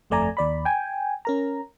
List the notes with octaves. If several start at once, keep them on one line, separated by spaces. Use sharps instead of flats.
G1 F2 A3 D5 G#5 A#5
D#2 D5 B5
G5 G#5
C#4 A#4 A#5